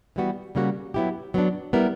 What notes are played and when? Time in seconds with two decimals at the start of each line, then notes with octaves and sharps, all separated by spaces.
0.16 E3 G3 B3 F#4
0.55 C#3 G3 A#3 C#4 F#4
0.94 F#3 B3 E4 G4
1.34 F#3 B3 D4
1.73 G3 B3 E4 A#4